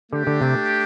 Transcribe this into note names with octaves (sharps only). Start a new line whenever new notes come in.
D3 A3 D4 G4
D3
C3